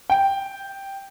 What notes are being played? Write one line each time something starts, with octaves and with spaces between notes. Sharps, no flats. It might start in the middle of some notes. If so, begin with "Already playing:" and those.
G5